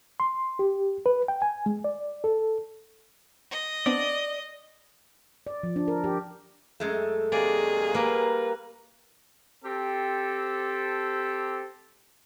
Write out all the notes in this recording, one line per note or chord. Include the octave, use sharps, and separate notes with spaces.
C6
G4
B4
G5
G#5
G#3
D5
A4
D#5
B3 C4 D4 D5
D5
F3
D4
A#4
G4
F#2 G#3 A3
C3 D#3 A#3 G#4 D5
G3 A#3 A#4 B4
C4 G4 A4